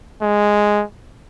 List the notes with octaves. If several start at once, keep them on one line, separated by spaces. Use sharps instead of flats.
G#3